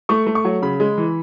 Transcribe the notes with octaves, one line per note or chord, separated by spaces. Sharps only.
A3 C#6
A3
C#6
F#3
C#3 B5
G#3
E3